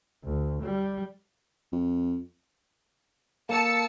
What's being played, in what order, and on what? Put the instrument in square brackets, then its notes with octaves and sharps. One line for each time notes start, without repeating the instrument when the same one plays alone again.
[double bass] D2
G3
[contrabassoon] F2
[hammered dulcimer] A#3 [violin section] A5 E6 C#7